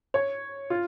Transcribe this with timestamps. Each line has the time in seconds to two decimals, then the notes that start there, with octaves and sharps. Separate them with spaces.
0.14 C#5
0.70 F4